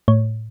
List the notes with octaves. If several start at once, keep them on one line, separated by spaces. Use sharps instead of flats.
A2 C#5